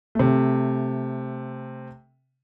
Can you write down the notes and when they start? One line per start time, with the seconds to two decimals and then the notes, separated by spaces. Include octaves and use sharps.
0.15 C3 A3